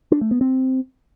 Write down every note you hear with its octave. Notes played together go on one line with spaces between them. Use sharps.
D4
A3
B3
C4